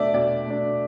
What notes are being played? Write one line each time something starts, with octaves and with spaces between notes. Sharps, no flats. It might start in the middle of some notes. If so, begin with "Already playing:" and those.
Already playing: B2 A3 D4 D5 E5
B2 D5
A3 D4